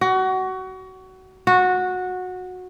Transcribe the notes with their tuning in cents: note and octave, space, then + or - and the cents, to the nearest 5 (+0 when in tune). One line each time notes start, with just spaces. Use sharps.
F#4 +25
F#4 -15